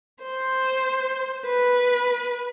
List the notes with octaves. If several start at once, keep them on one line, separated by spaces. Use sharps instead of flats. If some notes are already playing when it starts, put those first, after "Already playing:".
C5
B4